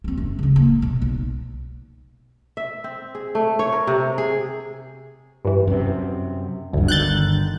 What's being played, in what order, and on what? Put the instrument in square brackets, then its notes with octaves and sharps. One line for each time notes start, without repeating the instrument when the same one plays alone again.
[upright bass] B3 C4
F#2
C#3 G#3
A#3
B2
B1
[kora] E5
C4
G#4
A3
C#5
A#4
C3
G#4
[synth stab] G2 E3
[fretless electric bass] F#2 C3
[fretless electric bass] F#1 G2 [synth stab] D2
[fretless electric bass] G1 D3 D#3 [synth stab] F#6 G6 A6